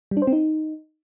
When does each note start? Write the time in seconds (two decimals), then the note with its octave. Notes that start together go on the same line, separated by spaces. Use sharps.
0.11 G3
0.17 D4
0.22 C5
0.27 C4
0.33 D#4